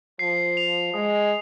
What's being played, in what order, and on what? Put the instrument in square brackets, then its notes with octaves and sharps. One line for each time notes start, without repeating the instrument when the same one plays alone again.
[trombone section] F3 [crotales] C7
[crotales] F7
[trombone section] G#3 [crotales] D#6